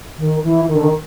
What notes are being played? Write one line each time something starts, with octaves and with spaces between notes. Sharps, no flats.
D#3
E3
D#3
D3
D#3